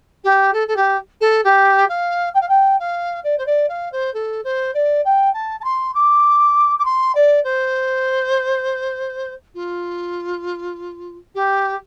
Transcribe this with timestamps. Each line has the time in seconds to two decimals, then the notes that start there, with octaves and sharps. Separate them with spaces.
0.24 G4
0.53 A4
0.68 A4
0.76 G4
1.21 A4
1.44 G4
1.89 F5
2.34 G5
2.41 F5
2.49 G5
2.80 F5
3.24 D5
3.38 C5
3.46 D5
3.69 F5
3.92 C5
4.14 A4
4.44 C5
4.74 D5
5.05 G5
5.34 A5
5.60 A5
5.64 C6
5.95 D6
6.79 D6
6.85 C6
7.15 D5
7.44 C5
9.55 F4
11.35 G4